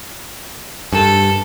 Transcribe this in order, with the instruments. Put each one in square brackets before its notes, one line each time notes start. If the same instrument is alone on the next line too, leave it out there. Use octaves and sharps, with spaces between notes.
[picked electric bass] G2 [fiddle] A4